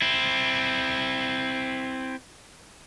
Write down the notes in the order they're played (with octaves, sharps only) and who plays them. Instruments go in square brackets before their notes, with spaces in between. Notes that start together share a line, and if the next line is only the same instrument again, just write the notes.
[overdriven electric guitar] C4 E4